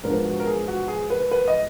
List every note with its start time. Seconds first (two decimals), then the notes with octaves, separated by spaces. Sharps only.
0.03 G#2 F3 B3 D4 A#4
0.25 F#4
0.40 A#4
0.46 G#4
0.68 F#4
0.88 G#4
1.10 B4
1.31 B4
1.48 D#5